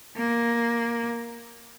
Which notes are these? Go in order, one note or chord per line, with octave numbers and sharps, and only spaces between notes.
A#3